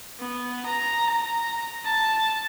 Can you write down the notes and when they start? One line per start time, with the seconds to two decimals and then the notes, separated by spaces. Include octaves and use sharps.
0.19 B3
0.66 A#5
1.07 A#5
1.85 A5